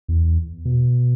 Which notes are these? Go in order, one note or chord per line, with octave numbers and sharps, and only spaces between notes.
E2
B2